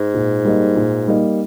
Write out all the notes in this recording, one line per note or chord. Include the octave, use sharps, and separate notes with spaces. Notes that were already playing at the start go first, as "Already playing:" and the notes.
Already playing: G#2
A#2
G3 A#3 D#4
A#2
G3 A#3 D#4